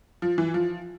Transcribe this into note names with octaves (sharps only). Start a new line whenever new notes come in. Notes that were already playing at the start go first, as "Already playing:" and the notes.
F3
E3
F3